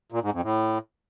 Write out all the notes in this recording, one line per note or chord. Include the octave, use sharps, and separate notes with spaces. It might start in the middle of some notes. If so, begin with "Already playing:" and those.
A#2
G#2
F2
A2